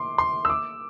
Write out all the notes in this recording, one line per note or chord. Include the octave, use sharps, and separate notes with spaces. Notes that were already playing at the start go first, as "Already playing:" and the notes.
Already playing: C6 D6
C6
E6
D6